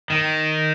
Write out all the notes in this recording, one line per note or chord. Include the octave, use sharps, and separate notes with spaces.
D#3